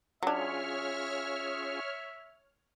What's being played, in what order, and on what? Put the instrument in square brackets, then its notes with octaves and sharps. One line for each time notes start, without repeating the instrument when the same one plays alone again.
[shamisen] F#3 D4 [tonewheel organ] C#4 F4 G#4 [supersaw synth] C#5 F6 [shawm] E5